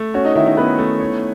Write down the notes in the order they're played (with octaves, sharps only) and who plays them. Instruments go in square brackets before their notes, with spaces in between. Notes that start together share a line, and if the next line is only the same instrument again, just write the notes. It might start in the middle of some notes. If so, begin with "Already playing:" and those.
Already playing: [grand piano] A3
[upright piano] C#4 C#5 [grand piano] F#4
[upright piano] D#4 D#5
[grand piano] D#3 [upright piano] E4 E5
[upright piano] D#4 D#5
[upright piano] B3 B4 [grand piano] C#4
[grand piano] A3
C#5